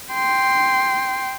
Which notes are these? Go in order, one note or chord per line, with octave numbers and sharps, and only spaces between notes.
G5 C6